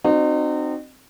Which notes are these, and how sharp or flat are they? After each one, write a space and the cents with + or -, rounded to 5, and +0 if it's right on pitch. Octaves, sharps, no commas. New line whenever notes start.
C4 +0 D#4 -35 F#4 +0